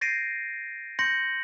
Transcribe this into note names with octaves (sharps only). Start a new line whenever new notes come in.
G6 A6 A#6 C7 D7 D#7
C6 G6 A#6 C#7 F#7